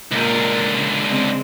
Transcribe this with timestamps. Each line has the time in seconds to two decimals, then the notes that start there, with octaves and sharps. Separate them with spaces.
0.12 C#2 A#2 D3 A#4
0.74 C#3
1.06 C#3 G#3 C4